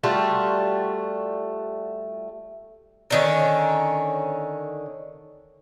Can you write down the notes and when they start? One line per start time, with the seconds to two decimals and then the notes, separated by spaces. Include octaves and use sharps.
0.03 G3 A3 F4 F#4
3.10 D3 D#3 C#4